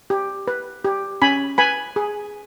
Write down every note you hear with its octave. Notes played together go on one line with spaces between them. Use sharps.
G4
B4
G4
C#4 G#5 B5
B4 G#5 B5
G#4